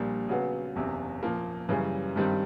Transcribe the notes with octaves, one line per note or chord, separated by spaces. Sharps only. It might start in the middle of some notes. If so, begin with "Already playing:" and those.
Already playing: A#1 A#2 G3 A#3
C#3 F#3 B3
F#1 E2 C3
A#2 F3 A#3
F#2 C#3 E3 G3
G2 D#3 G3 C4